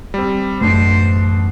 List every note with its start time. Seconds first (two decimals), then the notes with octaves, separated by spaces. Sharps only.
0.14 G3 C4
0.61 A1 F#2 B2 A3 D4 C5